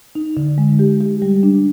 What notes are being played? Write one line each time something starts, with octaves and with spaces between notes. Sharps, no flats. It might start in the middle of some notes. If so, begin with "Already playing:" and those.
D#4
D3
G#3
G4
G4
G3
D4